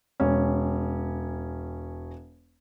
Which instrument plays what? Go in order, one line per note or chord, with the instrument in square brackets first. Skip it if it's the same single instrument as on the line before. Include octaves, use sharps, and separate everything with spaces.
[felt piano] E1 C#4